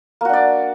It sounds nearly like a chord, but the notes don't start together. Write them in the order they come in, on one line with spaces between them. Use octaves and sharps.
A#3 F#4 D4 D5